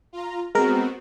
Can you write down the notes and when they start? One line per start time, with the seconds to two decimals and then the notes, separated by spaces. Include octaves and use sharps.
0.13 F4 A#5
0.55 G#3 B3 C4 F#4 A#4